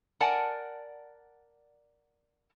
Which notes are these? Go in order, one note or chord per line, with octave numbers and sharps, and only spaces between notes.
A#4 D5 F#5 G#5 A5